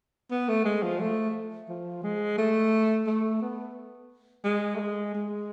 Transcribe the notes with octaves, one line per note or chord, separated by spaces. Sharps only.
B3
A3
G#3
F3
A3
F3
G#3
A3
A3
B3
G#3
A3
G#3
G#3